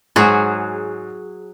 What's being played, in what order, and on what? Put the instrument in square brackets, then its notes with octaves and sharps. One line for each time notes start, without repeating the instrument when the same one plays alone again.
[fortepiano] G#2 [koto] F#3 F#4 G#4